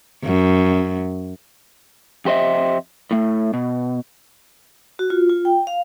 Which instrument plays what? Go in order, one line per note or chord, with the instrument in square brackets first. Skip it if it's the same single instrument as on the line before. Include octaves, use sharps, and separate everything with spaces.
[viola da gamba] F#2
[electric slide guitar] F2 G4 C5 D#5 E5
A2 A3
B2
[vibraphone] F#4
F4
F4
G5
F5